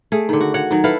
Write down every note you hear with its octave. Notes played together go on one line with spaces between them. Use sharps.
A3 G#4
D3 D#3
F#4
F#4 C#5 F#5
D#3 F#3
E4 A4 B4 F5